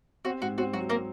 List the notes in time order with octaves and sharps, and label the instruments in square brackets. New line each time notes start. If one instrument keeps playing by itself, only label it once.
[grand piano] C4 [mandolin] F#4
[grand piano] G#2 [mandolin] F#4
[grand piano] C4 [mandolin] F#4
[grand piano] F#3 [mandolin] F#4
[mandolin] A#3 A#4